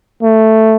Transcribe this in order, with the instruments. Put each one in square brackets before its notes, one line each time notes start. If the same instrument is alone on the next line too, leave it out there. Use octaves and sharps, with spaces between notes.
[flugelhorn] A3